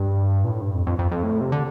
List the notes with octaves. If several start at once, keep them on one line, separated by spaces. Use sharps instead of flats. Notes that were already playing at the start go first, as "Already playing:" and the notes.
Already playing: G2
A#2
A2
G2
F2
F2
F2
F2
A2
C3
D3